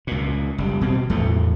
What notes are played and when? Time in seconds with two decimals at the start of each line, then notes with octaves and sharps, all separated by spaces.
0.07 C#2 A#2
0.58 F#1 G3
0.81 B2 C4
1.10 E2 A2 F3 A3